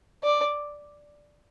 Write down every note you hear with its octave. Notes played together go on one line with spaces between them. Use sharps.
D5